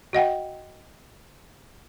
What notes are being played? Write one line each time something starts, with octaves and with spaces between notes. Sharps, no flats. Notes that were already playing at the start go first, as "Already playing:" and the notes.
F#4 D#5 F#5 G5